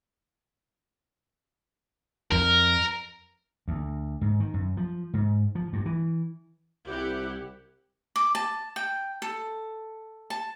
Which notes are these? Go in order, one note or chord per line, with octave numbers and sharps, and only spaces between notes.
F2 A#4
D2
G#2
D#3
F#2
F3
G#2
F3
G2
E3
C2 E4 G4 F#5
D6
A5
G5
A4
A5